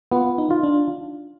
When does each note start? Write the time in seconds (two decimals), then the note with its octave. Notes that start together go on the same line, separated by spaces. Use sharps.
0.12 B3 F4
0.38 D#4
0.51 F4
0.63 D4